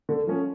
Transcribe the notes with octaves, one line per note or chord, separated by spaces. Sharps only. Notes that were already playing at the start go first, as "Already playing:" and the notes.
D3
F3 A3 C#4